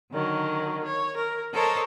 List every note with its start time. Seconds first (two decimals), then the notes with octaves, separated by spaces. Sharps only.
0.11 D3 D#3 F#3
0.85 C#5
1.15 A#4
1.53 A4 A#4 C5 C#5 D#5 A5